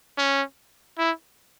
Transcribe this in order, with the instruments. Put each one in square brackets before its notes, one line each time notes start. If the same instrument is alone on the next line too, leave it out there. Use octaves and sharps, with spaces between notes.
[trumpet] C#4
E4